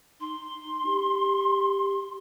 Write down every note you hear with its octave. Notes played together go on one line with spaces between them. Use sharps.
D#4 C6
G4